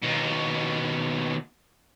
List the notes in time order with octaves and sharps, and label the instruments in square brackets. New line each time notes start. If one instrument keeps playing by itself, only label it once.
[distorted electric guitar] D#2 B2